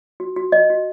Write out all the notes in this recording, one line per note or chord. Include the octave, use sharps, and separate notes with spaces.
F#4
F#4
F#4 D#5
F#4